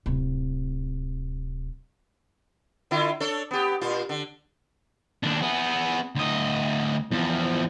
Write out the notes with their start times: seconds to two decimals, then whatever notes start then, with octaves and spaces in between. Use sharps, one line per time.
0.06 D1 C3
2.91 D3 E4 F4
3.20 D4 A4 C#5
3.51 B3 G4
3.81 A#2 F4
4.09 D3
5.23 D#2 D4
5.42 B3 G#4
6.15 D2 D#5
7.11 E2 F3